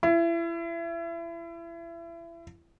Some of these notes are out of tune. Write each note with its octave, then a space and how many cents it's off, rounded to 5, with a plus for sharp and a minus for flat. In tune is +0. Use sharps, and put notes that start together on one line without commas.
E4 +30